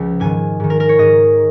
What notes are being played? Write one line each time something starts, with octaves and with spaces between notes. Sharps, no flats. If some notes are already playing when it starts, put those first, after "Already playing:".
Already playing: C#2 C#3 F3
G#2 D#3 G#5
G#2 D#3
A#4
A#4
C#5
G#2 D#3 D#5